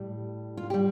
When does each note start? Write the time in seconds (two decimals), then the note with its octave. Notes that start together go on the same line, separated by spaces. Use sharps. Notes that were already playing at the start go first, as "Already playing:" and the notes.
Already playing: A2 G3
0.57 F4
0.70 G4
0.74 G3